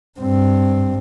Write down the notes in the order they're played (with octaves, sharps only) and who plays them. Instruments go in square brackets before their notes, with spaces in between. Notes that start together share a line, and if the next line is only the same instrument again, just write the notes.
[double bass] G2 C4